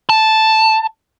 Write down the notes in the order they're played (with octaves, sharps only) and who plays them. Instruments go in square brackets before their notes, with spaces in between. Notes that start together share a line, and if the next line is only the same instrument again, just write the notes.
[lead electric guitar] A5